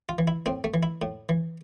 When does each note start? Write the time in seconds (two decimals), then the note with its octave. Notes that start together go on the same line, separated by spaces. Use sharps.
0.09 F4
0.18 E3
0.28 E4
0.46 A2 C4
0.64 A3
0.74 E3
0.83 E4
1.02 A2
1.29 E3